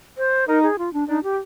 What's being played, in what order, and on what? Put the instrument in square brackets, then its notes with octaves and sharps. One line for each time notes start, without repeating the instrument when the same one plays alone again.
[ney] C5
[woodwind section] D#4 [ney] A#4
[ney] G#4
F4
D4
[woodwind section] D4 [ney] D#4
[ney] G4